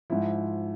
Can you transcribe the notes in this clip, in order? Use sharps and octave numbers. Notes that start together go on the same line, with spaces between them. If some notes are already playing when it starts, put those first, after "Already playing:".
G#2 F3 E4